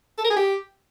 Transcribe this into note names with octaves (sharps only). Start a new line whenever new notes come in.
A4
A#4
G#4
G4